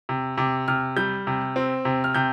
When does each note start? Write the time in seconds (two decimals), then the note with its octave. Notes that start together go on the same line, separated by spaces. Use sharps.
0.09 C3
0.37 C3 D6
0.68 C3 F6
0.96 G3 G6
1.27 C3
1.56 C4
1.85 C3
2.04 F6
2.15 C3 G6